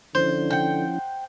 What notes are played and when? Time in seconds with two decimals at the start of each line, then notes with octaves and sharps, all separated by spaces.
0.15 D3 F3 C#4 E4 C5
0.51 F#5 G5